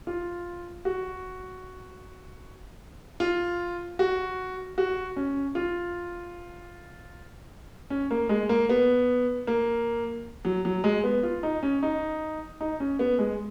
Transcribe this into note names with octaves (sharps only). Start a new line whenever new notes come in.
F4
F#4
F4
F#4
F#4
C#4
F4
C#4
A#3
G#3
A#3
B3
A#3
F#3
F#3
G#3
B3
F4
D#4
C#4
D#4
D#4
C#4
B3
G#3